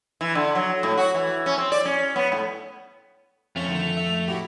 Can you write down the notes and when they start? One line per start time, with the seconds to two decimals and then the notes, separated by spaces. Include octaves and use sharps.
0.21 E3
0.35 D3
0.55 F#3
0.83 A2
0.98 F#4
1.14 E3
1.46 C#4
1.58 C4
1.72 D5
1.85 C#4
2.16 B3
2.32 A2
3.56 F2 F3 A3 C#4 C#6 F7
3.68 D3 D#3
3.97 E5
4.28 A2 E4 F#4 G4